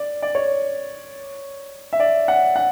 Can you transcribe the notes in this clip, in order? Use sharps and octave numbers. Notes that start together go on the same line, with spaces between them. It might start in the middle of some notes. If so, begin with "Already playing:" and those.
Already playing: D5
D5
C#5
E5
D5
F#5
F#5